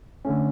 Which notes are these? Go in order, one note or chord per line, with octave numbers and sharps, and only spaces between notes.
D3 A3 C#4